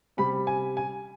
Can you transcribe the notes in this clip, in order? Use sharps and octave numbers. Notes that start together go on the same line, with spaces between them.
C3 G3 B5
G#5
G#5